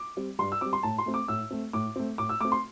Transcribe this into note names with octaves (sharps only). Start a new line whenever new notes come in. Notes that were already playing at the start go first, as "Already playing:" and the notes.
Already playing: D6
G3 C4
G2 C6
E6
G3 C4 D6
C6
A2 A5
C6
A3 C4
D6
A2 E6
A3 C4
A2 D6
A3 C4
A2 D6
E6
A3 C4 D6
C6